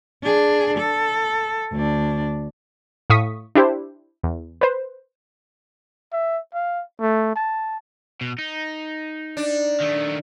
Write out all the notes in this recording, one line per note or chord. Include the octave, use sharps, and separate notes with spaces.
D4 G#4
A4
D2 D4
A2 F5 C#6 D#6 B6
D4 E4 G4 C5
E2
B4 C5
E5
F5
A3
A5
B2
D#4
D4
D#3 A3